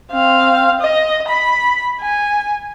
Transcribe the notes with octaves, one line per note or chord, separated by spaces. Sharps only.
C4 F5
D#5
B5
G#5